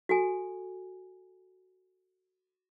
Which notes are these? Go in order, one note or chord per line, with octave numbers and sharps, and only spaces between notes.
F#4 A4 G#5